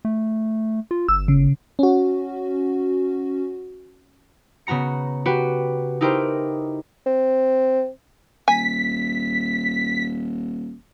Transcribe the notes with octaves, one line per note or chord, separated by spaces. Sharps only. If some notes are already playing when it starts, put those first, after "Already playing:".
A3
F4
G1 E6
C#3
C#4 F#4
C#3 B3 F#4 A#5 C#7
F#4 G4 B4
D#4 E4 G4 A#4 C5
C4
D#1 G#5 B6